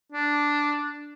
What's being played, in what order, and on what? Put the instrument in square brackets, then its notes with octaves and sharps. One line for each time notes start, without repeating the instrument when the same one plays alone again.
[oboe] D4